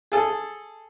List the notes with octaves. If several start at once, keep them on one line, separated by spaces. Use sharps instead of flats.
G#4 A4